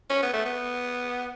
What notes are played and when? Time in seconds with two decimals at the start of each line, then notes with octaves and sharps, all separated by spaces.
0.10 C#4
0.22 B3
0.33 A3
0.45 B3